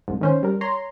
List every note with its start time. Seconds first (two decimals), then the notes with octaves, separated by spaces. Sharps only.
0.08 C2 G#2
0.21 D#3 C#4 C5
0.43 G3 A#4
0.61 C#5 A#5 C6